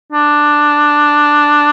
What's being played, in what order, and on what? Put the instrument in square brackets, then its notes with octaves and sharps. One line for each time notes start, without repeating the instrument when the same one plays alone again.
[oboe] D4